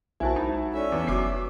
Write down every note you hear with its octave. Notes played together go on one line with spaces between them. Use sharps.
B1 E4 F#4 A#4 C5 G#5 A5
G#3 D#4 B5
C#4 A4 D5 E5
E2 B4
F#1 F#3 D6 C7